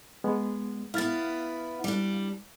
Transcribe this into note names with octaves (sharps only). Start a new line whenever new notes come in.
G#3 B3
B3 E4 F5 F6 A6
G3 D4